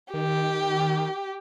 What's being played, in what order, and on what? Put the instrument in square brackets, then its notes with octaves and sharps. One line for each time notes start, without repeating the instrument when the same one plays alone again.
[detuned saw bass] D#3 [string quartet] G4